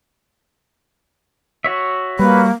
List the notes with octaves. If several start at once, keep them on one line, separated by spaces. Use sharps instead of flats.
F#4 C#5 E5
G3 A#3 B4